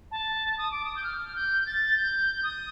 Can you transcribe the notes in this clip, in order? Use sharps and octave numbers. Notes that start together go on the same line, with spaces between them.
A5
D#6
D6
D#6
G6
F6
G6
A6
G6
D#6